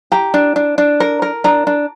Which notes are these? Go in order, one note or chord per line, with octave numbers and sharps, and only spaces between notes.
G4 A#5
D4
D4
D4
A#4
A#4
D4 A#5
D4